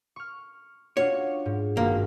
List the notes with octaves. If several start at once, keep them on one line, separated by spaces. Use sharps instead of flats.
C#6 F6
D4 F4 F#4 C#5
G#2
G#1 G2 A#3 F#4